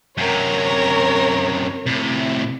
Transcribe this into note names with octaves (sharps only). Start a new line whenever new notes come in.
F#2 C3 A#4 C#5
A2 C3